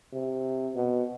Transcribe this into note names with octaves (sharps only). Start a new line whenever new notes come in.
C3
B2